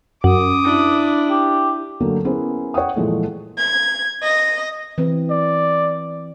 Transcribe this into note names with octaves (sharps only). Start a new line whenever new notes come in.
F#2 D6 D#6
D4 E4
G4
D3 F#3 A3 A#3
B3 C#4 E4 G#4 A#4 C5
C#5 F#5 G5 D#6
A#2 E3 F3 G#3 A3
G#6
D#5
E3 C4
D5